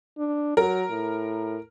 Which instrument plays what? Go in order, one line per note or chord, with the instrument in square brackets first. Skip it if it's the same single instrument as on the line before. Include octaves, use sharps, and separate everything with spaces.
[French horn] D4
[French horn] F#3 [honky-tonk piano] A#4
[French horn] A2